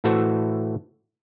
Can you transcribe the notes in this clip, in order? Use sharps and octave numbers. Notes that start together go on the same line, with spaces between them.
A2 E3 A3 F#4 C5 E5